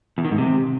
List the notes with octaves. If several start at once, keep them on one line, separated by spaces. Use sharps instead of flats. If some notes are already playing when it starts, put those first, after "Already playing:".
E2
D#3
G#2
C3